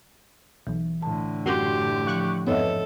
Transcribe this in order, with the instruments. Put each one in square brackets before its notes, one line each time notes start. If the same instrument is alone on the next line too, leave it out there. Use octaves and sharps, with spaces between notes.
[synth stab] B1 [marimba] E3
[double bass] A2 D3 [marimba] A5
[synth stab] F#2 F#4 C6 [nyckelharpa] G4
[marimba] F3 [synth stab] C#6 F#6
[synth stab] F2 G#2 B3 [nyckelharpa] A4 [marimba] C#5 D#5 E5